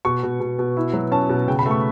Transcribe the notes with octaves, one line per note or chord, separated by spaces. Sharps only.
B2 C#6
B2
B2
B2
E4
F#3
C#4 A5
B2
C#3 G5
B5
A3
C#6